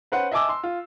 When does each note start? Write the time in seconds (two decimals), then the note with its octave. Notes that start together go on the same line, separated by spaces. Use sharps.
0.12 C#4 B4 C5 F#5 C6
0.32 D#5 E5 G#5 A5 D6 E6
0.49 C6
0.63 F4